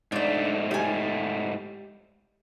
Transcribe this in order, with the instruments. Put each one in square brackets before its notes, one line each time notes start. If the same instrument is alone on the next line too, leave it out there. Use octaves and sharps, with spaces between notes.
[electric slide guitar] G#2 A3 [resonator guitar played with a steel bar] D4 D5
[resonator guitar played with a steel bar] G3 G#5